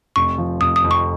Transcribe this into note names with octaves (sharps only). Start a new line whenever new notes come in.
F1 C#6
F3
F1 D#6
D#6
F2
C#6